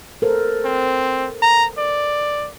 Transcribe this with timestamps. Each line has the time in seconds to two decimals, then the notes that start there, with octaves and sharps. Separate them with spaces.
0.22 A4 A#4 C5
0.65 C4
1.42 A#5
1.78 D5